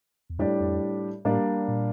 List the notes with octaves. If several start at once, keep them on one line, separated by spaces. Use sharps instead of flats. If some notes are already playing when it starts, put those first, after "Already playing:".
E2
F2 A2 G3 D4 G4 D5
F2
A2 G3 A#3 D4 G4 D5
A#2